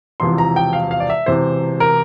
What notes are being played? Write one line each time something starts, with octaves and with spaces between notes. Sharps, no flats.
E1 E2 C3 F3 C6
A#5
G5
F5
F5
D5
E5
E1 E2 C3 E3 C5
A#4